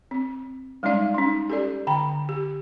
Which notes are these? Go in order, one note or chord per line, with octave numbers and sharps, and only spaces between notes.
C4
G3 G#3 C#4 D#4 D5 F5
C#4 D#4
G4 A4 D5
D3 G5 A#5
G4